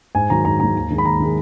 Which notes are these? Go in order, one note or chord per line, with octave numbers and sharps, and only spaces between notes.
G#2 G#5
D#3 F#3 A#5
G#2 A#5
D#3 F#3 A#5
D#2
D#3 G#3
B5
D#2 A#5
D#3 G#3